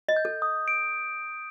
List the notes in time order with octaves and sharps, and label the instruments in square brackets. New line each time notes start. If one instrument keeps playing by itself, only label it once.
[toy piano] D#5
[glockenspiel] G6
[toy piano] A4
[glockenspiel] D#6
D7